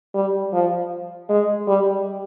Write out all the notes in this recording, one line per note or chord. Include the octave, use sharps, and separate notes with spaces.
G3
F3
G#3
G3